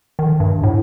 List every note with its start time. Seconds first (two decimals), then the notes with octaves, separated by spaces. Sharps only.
0.19 D#3
0.40 G2
0.63 A2